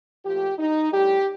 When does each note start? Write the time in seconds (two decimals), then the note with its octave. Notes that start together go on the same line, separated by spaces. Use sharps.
0.24 A#2 F3 A3 G4
0.58 D#4
0.91 A2 G3 G4